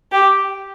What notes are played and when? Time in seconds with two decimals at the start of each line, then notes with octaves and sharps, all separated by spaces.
0.12 G4